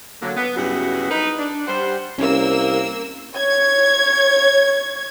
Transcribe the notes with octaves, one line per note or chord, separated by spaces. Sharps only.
D3 F#3 A#3
B3
G2 C#3 F#3 B3 E4 F#4
D#4 B4
D4
G3 C5 F#5
C2 A#3 C#4 E6
C#5 G#6